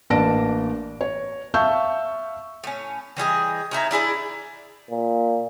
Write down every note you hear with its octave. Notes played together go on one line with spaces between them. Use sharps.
A1 A#3 D4 A5 A#6 D7
C#5
E5 F5 A5 C#6 E6 G6
A2 C#4
E3 G3 G#4 D#5
C#4 D#4 E4 A#5
D4 E4 G#4 D5
A#2